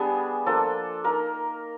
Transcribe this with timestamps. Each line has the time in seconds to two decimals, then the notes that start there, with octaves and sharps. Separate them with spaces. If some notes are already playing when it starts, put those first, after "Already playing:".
Already playing: G3 B3 D4 G#4
0.46 F3 A#3 D4 A4
1.04 A#3 D#4 A#4